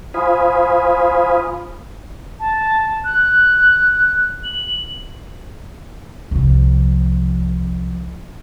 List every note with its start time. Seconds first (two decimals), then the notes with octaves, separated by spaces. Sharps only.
0.14 F4 C5 F5 G#5 B5 D#6
2.40 A5
3.05 F#6
4.44 F#7
6.31 C2 F3